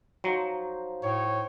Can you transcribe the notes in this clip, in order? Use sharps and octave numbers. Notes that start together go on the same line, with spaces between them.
F3 F#3 D#4 C5
A2 C#5